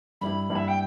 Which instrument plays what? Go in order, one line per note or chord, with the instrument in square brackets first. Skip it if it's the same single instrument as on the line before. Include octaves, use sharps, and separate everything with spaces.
[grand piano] G2 G3 E4 [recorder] B5
[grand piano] G2 G3 E4
[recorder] E5
G5